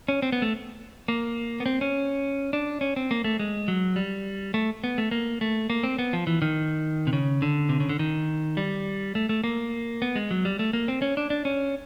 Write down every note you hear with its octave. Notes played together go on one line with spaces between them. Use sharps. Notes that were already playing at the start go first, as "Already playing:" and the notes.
C#4
C4
B3
A3
A#3
B3
C4
C#4
D4
C#4
C4
A#3
A3
G#3
F#3
G3
A3
B3
A3
A#3
A3
A#3
C4
B3
F3
E3
D#3
C3
C#3
D3
C3
C#3
D3
D#3
G3
A3
A3
A#3
B3
G#3
F#3
G3
A3
A#3
C4
C#4
D4
D4
C#4